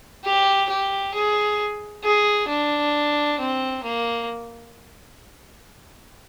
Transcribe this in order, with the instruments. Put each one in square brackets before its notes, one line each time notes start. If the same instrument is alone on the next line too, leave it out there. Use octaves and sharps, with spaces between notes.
[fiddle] G4
G4
G#4
G#4
D4
C4
A#3